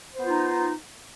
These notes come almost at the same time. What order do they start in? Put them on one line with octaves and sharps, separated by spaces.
C5 B3 F4 D#4